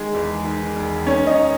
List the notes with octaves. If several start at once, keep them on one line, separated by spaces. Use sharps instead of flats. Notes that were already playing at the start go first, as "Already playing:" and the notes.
Already playing: D#3 G#3 G#4
E2
D#3
E1
D#3 C#4 C#5
D#4 D#5